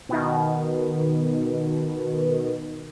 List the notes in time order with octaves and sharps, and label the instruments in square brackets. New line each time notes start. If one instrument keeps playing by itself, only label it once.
[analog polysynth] B2 D#3